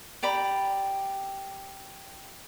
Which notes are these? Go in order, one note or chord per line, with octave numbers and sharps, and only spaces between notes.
G4 D5 A#5 B5